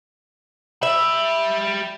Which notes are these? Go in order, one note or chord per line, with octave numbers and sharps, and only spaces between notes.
G4 E5 B5